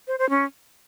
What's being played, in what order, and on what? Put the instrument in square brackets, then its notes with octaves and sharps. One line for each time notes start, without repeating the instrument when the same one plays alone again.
[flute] C5
C5
C#4